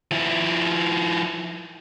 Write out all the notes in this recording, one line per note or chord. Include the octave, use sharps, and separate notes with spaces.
F3 E4